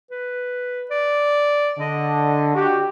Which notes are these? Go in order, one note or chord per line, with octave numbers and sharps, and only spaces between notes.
B4
D5
D3 D#5
F#4 G4